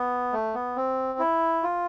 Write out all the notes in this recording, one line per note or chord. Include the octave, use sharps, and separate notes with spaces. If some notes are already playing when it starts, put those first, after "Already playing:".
Already playing: B3
A3
B3
C4
E4
F4